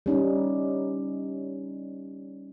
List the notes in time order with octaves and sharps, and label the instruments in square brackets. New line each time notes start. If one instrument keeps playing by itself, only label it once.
[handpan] G3 C#4 D#4